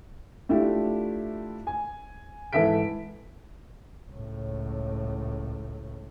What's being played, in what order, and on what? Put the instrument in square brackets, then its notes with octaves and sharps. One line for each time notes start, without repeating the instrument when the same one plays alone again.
[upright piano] A3 D4 E4 F4 G4
G#5
G#2 E3 A4 E5 B6 D7
[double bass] C#2 A2